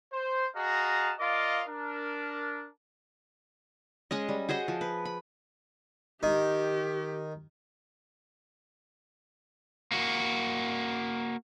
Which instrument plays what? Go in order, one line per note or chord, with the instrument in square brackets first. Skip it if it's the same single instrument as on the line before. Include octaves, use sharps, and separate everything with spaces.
[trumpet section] C5
F#4 G#4 D#5 F5 A5 A#5
F4 A#4 D5 D#5 F5 D6
D4 A#4
[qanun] G#3 C#4 D#5
G3
F#4 G#4 C5 D#5
F3
B4
B5
[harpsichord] D#3 [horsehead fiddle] G4
[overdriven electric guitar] A#3 F#4